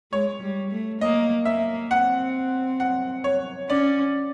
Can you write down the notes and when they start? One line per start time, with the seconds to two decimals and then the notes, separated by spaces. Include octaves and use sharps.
0.12 G#3 C#5
0.42 G3
0.71 A3
1.01 A#3 D#5
1.45 A#3 E5
1.91 C4 F#5
2.80 F#5
3.24 C#5
3.69 C#4 D5